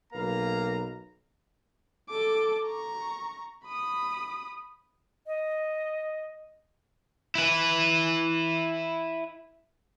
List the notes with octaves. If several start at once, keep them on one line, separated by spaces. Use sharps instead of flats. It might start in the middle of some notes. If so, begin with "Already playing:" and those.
B1 A#3 B4 F5 A#5
A4 D6
A#5 C#6
B5 D#6
D#5
E4 B4